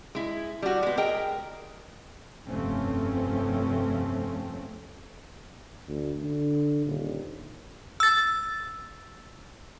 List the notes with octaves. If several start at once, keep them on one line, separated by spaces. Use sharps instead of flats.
G#3 E4
G3 F#4
G#3 B3
G#4 A#4 D#5 G5
F1 G2 F3 A3 C4 C#4
D2
D3
D#1
E6 A6